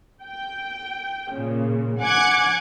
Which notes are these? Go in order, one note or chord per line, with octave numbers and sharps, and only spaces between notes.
G5
A#2 C#3
F#5 G#5 D6 F#6 G#6